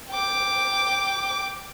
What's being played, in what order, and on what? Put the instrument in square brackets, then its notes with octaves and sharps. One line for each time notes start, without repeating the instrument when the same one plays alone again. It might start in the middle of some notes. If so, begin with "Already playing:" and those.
[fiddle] G5 D6